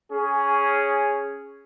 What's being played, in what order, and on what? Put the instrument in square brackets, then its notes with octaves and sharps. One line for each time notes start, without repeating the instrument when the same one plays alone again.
[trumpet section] C#4 G#4